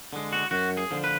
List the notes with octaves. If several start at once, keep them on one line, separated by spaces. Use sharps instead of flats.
D3 G#3
F#4
F#2 F#4
G#4
D3 F3
B4